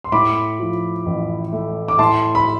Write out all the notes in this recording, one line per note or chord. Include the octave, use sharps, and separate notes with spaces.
C6
A2 B5 D6
F3
A1
A3
D6
A2 A5 C6
B5